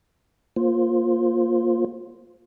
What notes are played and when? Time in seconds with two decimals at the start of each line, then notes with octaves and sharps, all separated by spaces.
0.56 A#3 F4 C5